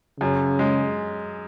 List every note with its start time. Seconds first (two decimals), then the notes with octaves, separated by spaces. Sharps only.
0.20 F#2 C#3
0.59 G#3